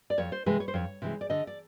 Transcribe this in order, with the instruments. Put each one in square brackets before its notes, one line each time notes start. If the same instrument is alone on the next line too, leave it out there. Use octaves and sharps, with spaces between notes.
[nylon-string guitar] D5
F2 C#5
C5
C3 E3 G#3 B4
C#5
C5
F2 C#5
C3 E3 G#3
D5
D3 D#5
D5